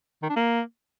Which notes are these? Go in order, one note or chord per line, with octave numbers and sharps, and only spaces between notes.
D#3
D4
A#3